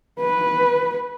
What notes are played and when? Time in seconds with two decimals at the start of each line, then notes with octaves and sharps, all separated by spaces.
0.20 B4